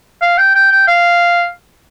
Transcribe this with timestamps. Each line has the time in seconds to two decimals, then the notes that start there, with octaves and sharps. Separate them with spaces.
0.22 F5
0.38 G5
0.55 G5
0.71 G5
0.87 F5